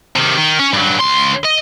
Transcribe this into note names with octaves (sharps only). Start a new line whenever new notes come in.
C3 D#3
D#3
C#4
G2 F#3
C#2 C6
D#5